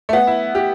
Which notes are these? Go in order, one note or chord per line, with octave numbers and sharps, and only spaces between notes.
A3
B3
E4
G4